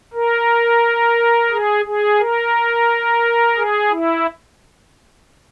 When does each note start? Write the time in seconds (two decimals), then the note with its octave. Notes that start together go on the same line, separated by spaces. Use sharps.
0.14 A#4
1.51 G#4
1.85 G#4
2.19 A#4
3.56 G#4
3.91 E4